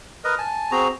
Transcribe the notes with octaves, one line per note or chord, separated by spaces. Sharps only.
A#4 B4 D#5
G#5 A5
C4 F#4 G#4 A#5